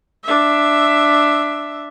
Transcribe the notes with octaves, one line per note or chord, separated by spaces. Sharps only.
D4 E5